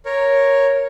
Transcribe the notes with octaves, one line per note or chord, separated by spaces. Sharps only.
A#4 C#5